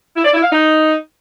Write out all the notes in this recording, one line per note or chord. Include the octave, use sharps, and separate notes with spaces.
E4
D5
E4
F5
D#4